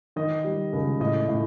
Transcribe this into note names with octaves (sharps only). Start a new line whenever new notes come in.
D#3 D#5
G3
C#2
A2 D#5
A2